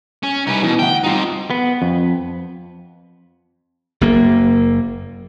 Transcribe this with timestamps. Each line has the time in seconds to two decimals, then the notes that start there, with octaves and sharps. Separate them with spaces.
0.23 C#4
0.47 C2 D#4 B4
0.63 B2 E3
0.79 D2 F#5 G5
1.04 G2 C4 D#4 F4
1.50 B3
1.82 F2
4.01 F#1 A#3